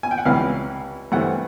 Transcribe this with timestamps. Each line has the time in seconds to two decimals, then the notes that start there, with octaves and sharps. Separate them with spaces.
0.03 G#5
0.11 G5
0.18 F#5
0.25 C#2 C3 E3 G3 F5
1.12 G2 E3 A3 C4 F#5